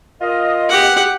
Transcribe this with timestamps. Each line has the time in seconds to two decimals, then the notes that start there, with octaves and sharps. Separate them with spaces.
0.21 F4 A#4 D#5
0.70 G4 F#5